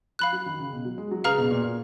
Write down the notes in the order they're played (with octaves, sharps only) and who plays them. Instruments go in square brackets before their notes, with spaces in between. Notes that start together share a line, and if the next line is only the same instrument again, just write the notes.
[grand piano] F3 [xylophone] F5 B5 F#6
[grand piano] F#3
D#3
C#3
B2
F#3
G#3
F#3
[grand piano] C#3 [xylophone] G#4 B4 F5 A#5 F6
[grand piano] B2
A#2
A#2